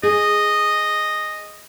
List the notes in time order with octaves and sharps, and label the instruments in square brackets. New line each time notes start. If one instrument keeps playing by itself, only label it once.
[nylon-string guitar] G#4 [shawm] D#5